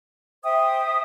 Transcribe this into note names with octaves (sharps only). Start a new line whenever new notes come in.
C5 E5 G5 D#6